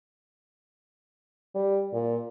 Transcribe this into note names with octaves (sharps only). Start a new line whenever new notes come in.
G3
A#2